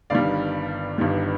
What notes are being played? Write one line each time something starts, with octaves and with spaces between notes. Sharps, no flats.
G1 G2 D#3 G3 D5 F5
G1 G2 D#3 G3